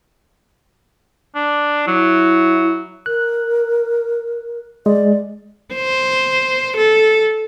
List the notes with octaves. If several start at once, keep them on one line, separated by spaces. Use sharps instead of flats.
D4
F#3 E4
A#4 F#6
G#3 D5
C5
A4